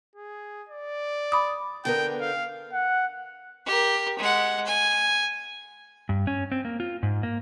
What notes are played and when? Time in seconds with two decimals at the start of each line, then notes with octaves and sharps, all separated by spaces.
0.16 G#4
0.69 D5
1.32 B5 D6 D#6
1.85 D3 B3 A#4 G5
2.21 F5
2.73 F#5
3.66 G4 A#4
4.19 G#3 F#5
4.66 G#5
6.09 G2
6.27 C#4
6.52 C4
6.65 A#3
6.80 F4
7.03 G#2
7.23 A#3